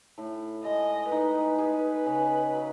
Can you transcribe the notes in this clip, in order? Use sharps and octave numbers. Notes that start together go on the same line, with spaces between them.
A2
G#3 D#5
D#4 B4
G#4
C#3
F#3